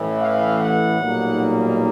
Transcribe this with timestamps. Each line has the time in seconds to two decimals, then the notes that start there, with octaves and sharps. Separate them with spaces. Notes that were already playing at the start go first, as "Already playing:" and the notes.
Already playing: A1 A2 E3
0.20 F5
0.60 F#5
1.00 B1 A#2 G3 A#3 D#4